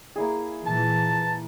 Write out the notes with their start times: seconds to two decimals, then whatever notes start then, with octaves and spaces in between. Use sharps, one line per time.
0.16 A#3 E4 G#4
0.67 A#2 E3 A5